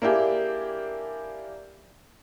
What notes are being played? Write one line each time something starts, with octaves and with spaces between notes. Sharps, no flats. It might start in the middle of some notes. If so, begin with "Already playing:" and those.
A#3 D4 E4 G4 G#4